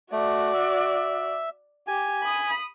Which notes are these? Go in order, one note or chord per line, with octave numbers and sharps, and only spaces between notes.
A3 F#4 D5
E5
G4 G#5
B5 D#6